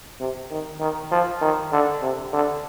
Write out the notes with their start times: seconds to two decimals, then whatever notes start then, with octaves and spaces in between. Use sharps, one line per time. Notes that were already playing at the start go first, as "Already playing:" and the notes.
0.20 C3
0.51 D#3
0.80 D#3
1.11 F3
1.42 D#3
1.72 D3
2.02 C3
2.33 D3